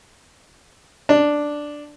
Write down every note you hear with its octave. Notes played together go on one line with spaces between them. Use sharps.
D4